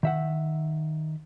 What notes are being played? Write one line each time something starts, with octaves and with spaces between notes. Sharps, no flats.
D#3 E5 F#5